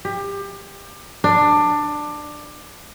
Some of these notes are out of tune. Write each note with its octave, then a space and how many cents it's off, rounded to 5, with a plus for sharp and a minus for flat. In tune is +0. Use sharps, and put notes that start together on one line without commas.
G4 +25
D4 +15